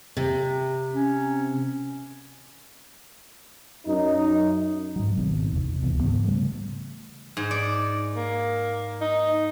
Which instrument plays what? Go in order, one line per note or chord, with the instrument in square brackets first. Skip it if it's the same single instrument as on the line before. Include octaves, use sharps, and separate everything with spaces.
[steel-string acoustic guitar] C3
[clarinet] C#4
[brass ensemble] F#2 D#4
[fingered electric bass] G#2 F#3
G#1 B2 D#3 C4
E2 C3
D1 C#2 E3 B3
G#2 C#3 E3 B3
C#3 G3 A3
[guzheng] G#2
D5
[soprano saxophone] A#3
D#4